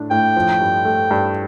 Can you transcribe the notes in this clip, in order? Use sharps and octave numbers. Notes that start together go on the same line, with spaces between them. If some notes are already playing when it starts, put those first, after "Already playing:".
Already playing: A2 D4
A2 G5
F3
G2
A3
G2